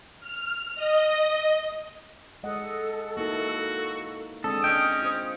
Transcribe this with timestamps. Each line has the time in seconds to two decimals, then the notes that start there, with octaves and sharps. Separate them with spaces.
0.21 F6
0.76 D#5
2.43 G#3 A4 D#5 F#5
3.17 A#3 D#4 E4 F#4
4.44 G#3 C4 D4 A4 D#6
4.64 C#4 D4 D#5 G5
5.02 F4 C5